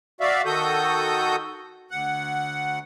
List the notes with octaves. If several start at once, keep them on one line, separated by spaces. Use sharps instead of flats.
F#4 D5 E5 F5
D#3 F#4 A4 D#6 G6
D2 F#5